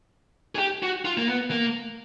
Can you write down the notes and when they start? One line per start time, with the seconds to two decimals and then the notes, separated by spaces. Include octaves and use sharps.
0.55 G#4
0.58 G4
0.83 F#4
1.05 F4
1.17 A#3
1.29 B3
1.51 A#3